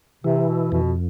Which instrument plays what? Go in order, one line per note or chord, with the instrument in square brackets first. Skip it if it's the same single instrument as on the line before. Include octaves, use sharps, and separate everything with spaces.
[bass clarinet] C3 [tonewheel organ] E3
[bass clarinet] B2
[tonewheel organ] F2 [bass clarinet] B2